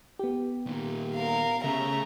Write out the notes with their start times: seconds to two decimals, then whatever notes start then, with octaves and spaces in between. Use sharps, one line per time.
0.19 B3 G4
0.67 A#2 D#3
1.15 A#4 F5
1.64 C#3 A3 E5 A#5